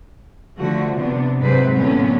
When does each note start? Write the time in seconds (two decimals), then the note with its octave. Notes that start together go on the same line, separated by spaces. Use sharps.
0.58 D3 F3 A3 F#4
0.97 C3 B3 D4
1.40 G#2 C3 F#3 B4 C5
1.77 A2 D3 F#3 A#3 B3 C#4